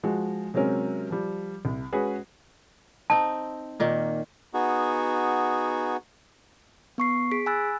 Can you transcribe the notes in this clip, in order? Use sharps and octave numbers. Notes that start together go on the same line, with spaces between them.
F3 G#3 F#4
C3 F#3 G#3 C4 C#4 A#4
F3 G3
C2
G#3 C#4 F#4 G#4 B4
C4 D#4 A5
A#2 D#3 A#3
B3 D#4 F#4 G#4
B3 C#6 C7
G#4 B6 D7
G#5 B5 E6 F#6 A6